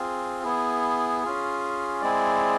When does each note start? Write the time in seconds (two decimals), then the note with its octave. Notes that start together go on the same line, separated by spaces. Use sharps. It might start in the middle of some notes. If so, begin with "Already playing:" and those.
Already playing: C4 F4 G#4
0.43 B3 E4 G#4
1.23 C#4 F4 G#4
2.02 G#3 C4 E4 G#4 D5